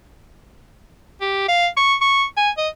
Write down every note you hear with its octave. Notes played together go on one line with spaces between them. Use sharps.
G4
F5
C#6
C#6
G#5
D#5